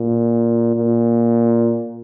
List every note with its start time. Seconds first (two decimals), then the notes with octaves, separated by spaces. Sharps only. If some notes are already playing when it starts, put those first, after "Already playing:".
Already playing: A#2
0.76 A#2